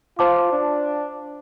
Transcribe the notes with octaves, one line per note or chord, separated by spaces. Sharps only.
F4 C5 F5 A5 D6
D4